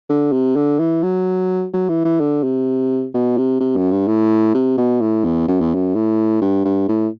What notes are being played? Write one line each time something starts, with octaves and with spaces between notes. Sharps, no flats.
D3
C3
D3
E3
F#3
F#3
E3
E3
D3
C3
B2
C3
C3
F#2
G2
A2
C3
B2
A2
E2
F#2
E2
F#2
A2
G2
G2
A2